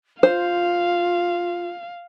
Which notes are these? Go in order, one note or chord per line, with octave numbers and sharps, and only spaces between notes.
F4 C5 F5